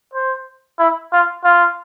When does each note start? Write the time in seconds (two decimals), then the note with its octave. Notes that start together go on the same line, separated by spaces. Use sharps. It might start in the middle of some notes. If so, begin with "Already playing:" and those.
0.14 C5
0.79 E4
1.12 F4
1.44 F4